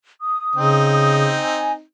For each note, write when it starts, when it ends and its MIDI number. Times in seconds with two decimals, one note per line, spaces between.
0.20 1.27 87
0.56 1.39 49
0.56 1.82 60
0.56 1.82 63
1.36 1.71 80